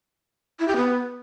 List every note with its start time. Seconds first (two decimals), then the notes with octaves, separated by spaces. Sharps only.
0.60 E4
0.68 G4
0.77 B3